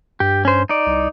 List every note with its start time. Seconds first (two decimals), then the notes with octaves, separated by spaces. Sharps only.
0.20 G2 G4
0.45 C#4 C5
0.69 D#4 D5
0.86 C2